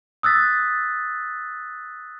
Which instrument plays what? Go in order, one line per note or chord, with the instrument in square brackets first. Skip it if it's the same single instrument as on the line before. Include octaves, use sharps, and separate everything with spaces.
[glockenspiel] D#6 E6 F#6 A6 B6